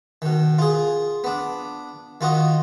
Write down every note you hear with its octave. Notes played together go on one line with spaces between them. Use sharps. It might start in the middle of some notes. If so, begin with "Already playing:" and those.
B2 D#3
F4 G#4
B3 D4
D#3 F4 F#4 D#5